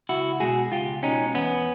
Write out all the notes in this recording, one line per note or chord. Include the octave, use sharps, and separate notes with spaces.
C#2 E4 F#4
B2 G#3 F#4 G#4
C#2 F4 G4
B2 G#3 C#4 D#4
E2 B3 C#4